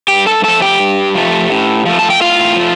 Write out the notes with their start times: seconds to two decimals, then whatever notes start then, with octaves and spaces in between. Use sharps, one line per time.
0.08 G2 G4 G5
0.26 A4 A5
0.44 F3 A3 A4 A5
0.62 G4 G5
0.80 G2
1.15 F3 A3
1.50 A2
1.86 F3 A3
1.99 A5
2.10 G5
2.21 A2 F4 F5
2.56 F3 A3